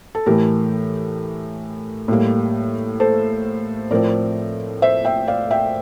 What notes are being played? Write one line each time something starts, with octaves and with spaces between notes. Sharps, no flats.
A4
A2 E3 A3 G4 A#4
A2 G3 A#3
A4 C5
A2 F3 A3 C4 A#4 D5
C5 E5
E5 G5
D5 F5
E5 G5